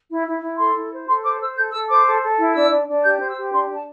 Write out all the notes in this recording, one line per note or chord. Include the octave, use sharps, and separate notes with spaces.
E4
E4
E4
A4 C6
E4
C5
A4 C6
C5 D6
C5 E6
A4 G6
A4 E6
C5 D6
A4
A4
E4
D4 E6
D4
D4
G4 G6
C5 G6
E6
G4
D4 C6
D4
A5